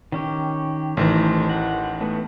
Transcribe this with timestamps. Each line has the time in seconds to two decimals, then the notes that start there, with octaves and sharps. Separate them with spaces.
0.12 D#3 C#4 G4
0.97 A1 D#3 E3 A3 C5 A#5
1.49 F#5
2.01 A3 B3